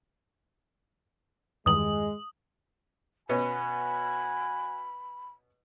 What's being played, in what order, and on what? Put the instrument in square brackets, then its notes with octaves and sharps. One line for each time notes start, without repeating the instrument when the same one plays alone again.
[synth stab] E2 G2 D#3 [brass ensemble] G#3 [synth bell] D#6 F#7
[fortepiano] B2 B3 C#4 [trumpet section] F#4 G#5 [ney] B5